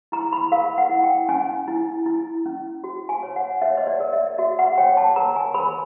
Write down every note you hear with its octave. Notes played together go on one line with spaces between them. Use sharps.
E4 A#5
B5
A#4 F5
F#5
E4
G5
C#4 G#5
E4
E4
C#4
F#4
G#5
C#5
F#5
C#5 E5
D#5
D5
A#4
E5
F#4 E5
F#5
C#5 G5
A5
A#4 A#5
G#5
A#4 B5